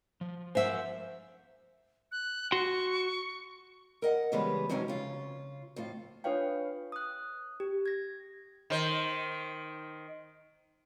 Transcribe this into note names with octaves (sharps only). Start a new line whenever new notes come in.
F3
A#4 C5 E5 F#5 G#5
F#6
F#4 C6 C#6
A#4 D#5 F#5
C#3 E3 G3 G#3 B3 B4
F2 G#2 C3 F#3 C#4
C#3 F4
F2 A2 F4
D4 F4 B4 C#5 F5 G5
D#6 F#6
G4
G#6 A#6
D#3 C5